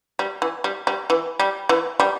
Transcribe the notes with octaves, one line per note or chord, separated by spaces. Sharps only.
G3
E3
G3
G3
E3
G3
E3
G3